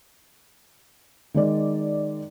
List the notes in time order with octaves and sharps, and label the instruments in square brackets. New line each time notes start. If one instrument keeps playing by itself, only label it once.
[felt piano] D#3 G#3 D5